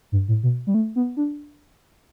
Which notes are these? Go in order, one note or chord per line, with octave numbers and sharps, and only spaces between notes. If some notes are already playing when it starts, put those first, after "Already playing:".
G2
A2
B2
G3
A3
B3
D4